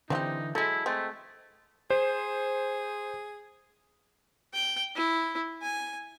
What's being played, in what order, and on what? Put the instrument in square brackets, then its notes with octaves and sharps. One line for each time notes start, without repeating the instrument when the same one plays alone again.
[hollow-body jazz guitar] D3 E3 [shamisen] C4 F#4 G4 [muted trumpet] D#4
[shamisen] F#3 G#3 [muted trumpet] E4 [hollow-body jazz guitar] A4
[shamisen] G#3 C4 [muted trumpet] A3
[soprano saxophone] G#4 [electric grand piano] C5
[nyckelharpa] G5
E4
G#5